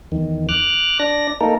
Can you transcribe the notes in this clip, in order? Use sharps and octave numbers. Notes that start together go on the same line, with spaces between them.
E2 D#3
D6 F6 F#6
D4 D5 A#6
A#3 D#4 A4 A#4